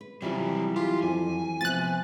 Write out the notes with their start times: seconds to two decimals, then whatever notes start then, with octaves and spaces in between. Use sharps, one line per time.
0.01 B4
0.22 C3 E3 F#3 G3 F4
0.76 F4 G4
1.02 F2 G#5
1.61 C3 F3 B3 F#6 A6